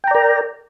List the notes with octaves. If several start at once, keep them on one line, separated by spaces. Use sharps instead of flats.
A#4 D5 G5 A#5